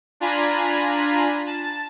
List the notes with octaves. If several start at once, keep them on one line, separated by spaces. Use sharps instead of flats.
D4 F4 G#5 A#5 B5
A5